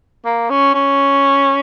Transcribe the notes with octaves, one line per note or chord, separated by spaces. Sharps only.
A#3
C#4
C#4